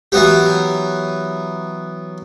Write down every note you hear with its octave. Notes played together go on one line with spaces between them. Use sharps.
E3 F#3 B3 G4